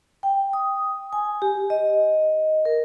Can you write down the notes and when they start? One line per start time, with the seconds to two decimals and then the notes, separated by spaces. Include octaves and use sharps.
0.23 G5
0.53 D#6
1.13 G#5
1.42 G4
1.70 D#5
2.65 A#4